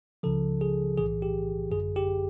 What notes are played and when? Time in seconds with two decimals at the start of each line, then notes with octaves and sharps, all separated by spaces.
0.23 C#2 C#3 F3 A4
0.61 G#4
0.98 B1 A2 E3 G#4
1.22 G4
1.71 G#1 F#2 D3 G#4
1.96 G4